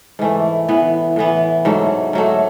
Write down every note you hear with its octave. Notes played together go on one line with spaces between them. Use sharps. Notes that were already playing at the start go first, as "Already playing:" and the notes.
G#2 E3 A3
A2 E3 B3
A2 E3 B3
G#2 F#3 A3
G#2 F#3 A3